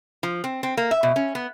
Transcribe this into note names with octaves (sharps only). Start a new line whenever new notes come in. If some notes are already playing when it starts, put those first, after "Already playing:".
F3
C4
C4
A#3
E5
B2
C#4
B3